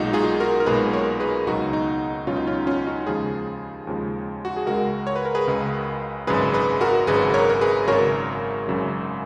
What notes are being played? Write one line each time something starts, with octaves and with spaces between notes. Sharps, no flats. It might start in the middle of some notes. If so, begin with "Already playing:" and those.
Already playing: B1 A#2 G#3 D#4 F#4
F4 G#4
F#4 A#4
A#4
B1 A#2 G#3 G#4 B4
A#4 C#5
G#4 B4
C#2 B2 F#3 D#4 F#4
D#4
C#2 B2 F#3 C#4 F4
D#4
C#4 F4
C#4 F4
D#4 F#4
D#2 C#3 F3 G#3 F4 G#4
D#2 C#3 F3 G#3
F#4
G#4
C#2 C#3 G#3 F#4 A#4
C#5
B4
A#4
G#4 B4
C#2 C#3 G#3
G#1 F#2 C#3 G#3 G#4 B4
G#4 B4
F#4 A#4
G#1 F#2 C#3 G#3 G#4 B4
A#4 C#5
A#4
G#4 B4
G#1 F#2 C#3 F#3 A#4 C#5
G#1 F#2 C#3 F#3